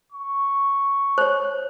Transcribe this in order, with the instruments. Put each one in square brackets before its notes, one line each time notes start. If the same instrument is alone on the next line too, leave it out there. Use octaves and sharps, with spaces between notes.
[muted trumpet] C#6
[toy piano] C5 C#5